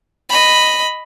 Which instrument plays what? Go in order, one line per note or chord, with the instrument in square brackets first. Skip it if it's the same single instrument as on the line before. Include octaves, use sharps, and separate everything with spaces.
[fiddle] D#5 B5